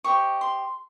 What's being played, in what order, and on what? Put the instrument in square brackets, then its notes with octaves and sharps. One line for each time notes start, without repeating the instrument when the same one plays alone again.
[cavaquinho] G4 C5 D#5 C#6
C6